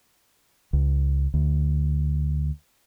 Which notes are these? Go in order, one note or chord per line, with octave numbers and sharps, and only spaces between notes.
C#2
D2